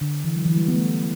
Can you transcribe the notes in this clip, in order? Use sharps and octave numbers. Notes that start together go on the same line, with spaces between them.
D3
E3
F#3
E3
G3
B3
A3
G3